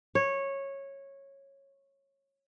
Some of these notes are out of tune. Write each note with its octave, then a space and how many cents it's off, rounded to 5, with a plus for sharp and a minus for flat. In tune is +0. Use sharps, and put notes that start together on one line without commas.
C#5 -15